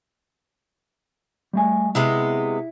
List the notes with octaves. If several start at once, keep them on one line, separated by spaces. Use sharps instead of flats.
G3 A3 G#5
C3 G#3 B3 E4